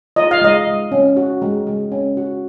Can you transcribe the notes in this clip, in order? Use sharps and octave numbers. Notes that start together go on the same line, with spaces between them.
F4 D#5
F5
G#3 D#5
G#3
C#4
F#4
G#3
G#3
C#4
F#4